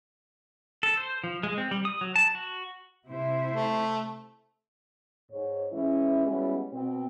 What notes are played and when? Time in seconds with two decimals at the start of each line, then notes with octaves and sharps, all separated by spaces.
0.83 A4
0.97 C5
1.24 F3
1.43 G#3
1.58 C4
1.71 G3
1.85 D#6
2.01 F#3
2.16 A5
2.35 F#4
3.07 C3 E4 C5
3.51 A3
5.31 G#2 C#5
5.72 E3 G#3 C#4 E4
6.26 G3 G#3 B3 C#4 E4 F#4
6.72 B2 C4